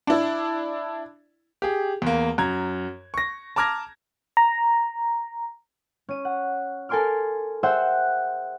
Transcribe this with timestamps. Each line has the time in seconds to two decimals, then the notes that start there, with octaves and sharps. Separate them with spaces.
0.07 D4 E4
1.62 G4 G#4
2.02 E2 A#3
2.38 F#2 A#5 G#6
3.14 C#6 A#6
3.56 A5 A#5 D6 F6 G#6 A#6
4.37 A#5
6.09 C#4 D#7
6.25 F#5
6.89 A4 A#4 G#5 C6 D6 F6
7.63 G#4 C5 E5 F#5 G5 F#6